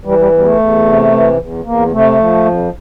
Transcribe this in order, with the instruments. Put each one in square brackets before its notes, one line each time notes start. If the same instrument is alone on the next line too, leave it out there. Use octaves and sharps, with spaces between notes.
[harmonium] E3 G3
G3
E2
G3
A3
E2
C3
E3
E2
E2 A#3
C3 A3
F3
F2